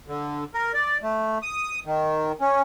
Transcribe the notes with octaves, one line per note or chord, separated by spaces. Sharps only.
D3
A#4
D5
A3
D#6
D#3
C#4